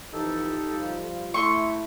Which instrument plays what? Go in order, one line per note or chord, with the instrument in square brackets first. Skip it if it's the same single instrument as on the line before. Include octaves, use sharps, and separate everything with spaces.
[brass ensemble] C3 E3 F3 [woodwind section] D#4 G4 A4
[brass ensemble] F3 G3 F4
[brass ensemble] A3 [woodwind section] E4 E5 [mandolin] C6 C#6